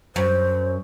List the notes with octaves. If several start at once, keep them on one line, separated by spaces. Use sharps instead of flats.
F#2 C5